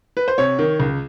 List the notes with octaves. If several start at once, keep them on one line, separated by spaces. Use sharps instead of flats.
B4
C5
C3 C#5
D#3
C#2